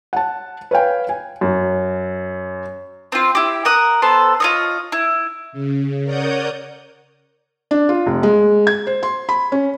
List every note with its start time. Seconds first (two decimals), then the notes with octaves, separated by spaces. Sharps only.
0.13 F#5 A5
0.71 B4 C#5 F5 G5 G#5
1.09 G#5
1.41 F#2
3.12 C4 F4
3.35 E4 G4
3.65 A#4 F#5 D#6
4.02 B3 A4 C5
4.40 F4 C#5 D#5
4.92 E4
5.52 C#3
6.04 A#4 C#5 D5 F#5 D#6 G6
7.71 D4
7.89 F4
8.06 F1
8.23 G#3
8.67 G#6
8.87 C5
9.03 C6
9.29 B5
9.52 C#4